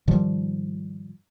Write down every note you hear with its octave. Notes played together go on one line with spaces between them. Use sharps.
G#2 D#3 F3 G3